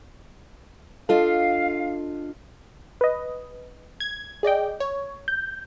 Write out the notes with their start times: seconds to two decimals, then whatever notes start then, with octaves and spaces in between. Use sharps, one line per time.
1.09 D4 F4 A4 D#5 F5
3.01 B4 D#5
4.00 G#6
4.43 G#4 D5 D#5 G5
4.80 C#5
5.28 G6